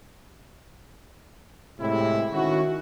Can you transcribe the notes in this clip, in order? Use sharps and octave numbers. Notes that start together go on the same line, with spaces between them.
A2 C3 G#3 C4 E4
D#3 C#4 E4 F#4